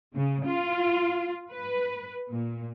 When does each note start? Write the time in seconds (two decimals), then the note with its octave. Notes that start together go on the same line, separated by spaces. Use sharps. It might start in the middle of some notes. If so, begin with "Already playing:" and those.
0.15 C#3
0.46 F4
1.50 B4
2.32 A#2